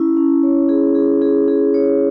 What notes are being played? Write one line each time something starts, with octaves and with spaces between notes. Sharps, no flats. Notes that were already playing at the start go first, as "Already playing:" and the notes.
Already playing: C#4 E4
C#4
C#5
G#4
G#4
G#4
G#4
C#5